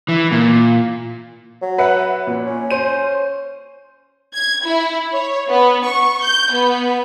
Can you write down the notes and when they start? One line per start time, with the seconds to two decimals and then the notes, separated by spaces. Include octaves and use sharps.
0.08 E3
0.32 A#2
1.62 F#3
1.78 B4 E5 F#5
2.27 A#2
2.46 C#4
2.71 C5 D#7
4.34 G#6
4.65 E4
5.12 C#5
5.50 B3
5.86 C#6
6.23 G6
6.53 B3